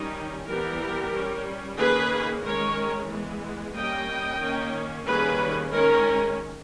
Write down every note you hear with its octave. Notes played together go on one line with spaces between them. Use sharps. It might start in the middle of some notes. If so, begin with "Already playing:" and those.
Already playing: D#3 G3 C#4 D#4 G4
E3 G3 B3 G4 A#4
G3 C#4
D#3 A#3 C#4 G#4 B4
D#3 G#3 C#4 A#4 C#5
E3 G#3 B3
G3 A#3 C#4 D#5 G5
D#3 A#3 C#4
D#3 G3 A#3 C#4 G#4 B4
D#3 G#3 C#4 A#4 C#5